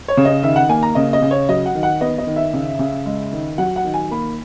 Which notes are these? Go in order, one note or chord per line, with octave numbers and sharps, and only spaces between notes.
C#5
C#3
D#5
D#3 E5
F#5
A#3 G#5
A#5
C#3 D#5
D#5
C#3
C#5
F#3 D#5
F#5
D#3
F#5
B3 D#5
D#5
D#3
E5
C#3
C#3
G#3
D#3
F#3 F#5
F#5
D#3
G#5
A#3 B5